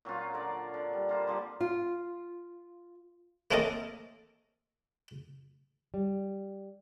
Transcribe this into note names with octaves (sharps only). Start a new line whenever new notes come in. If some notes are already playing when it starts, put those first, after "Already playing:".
A#2 F#3 C#4 F4
D3 A#4 D5
D3
G3
A#3 F4 C5
D3 F3 G3
F4
A3 A#3 C4 C#4 A4 D#5
G3